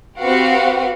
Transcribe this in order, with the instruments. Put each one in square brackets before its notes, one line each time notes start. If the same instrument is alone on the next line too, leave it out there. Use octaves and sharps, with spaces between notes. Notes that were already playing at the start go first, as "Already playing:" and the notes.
[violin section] C4 F#4 G4 B4 F5 F#5